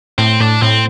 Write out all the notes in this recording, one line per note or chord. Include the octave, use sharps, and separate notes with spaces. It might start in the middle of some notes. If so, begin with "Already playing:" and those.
A2 C4
A2 D4
A2 C4